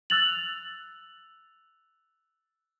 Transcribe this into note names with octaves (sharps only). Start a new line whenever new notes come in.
E6 F#6 A6 F7 F#7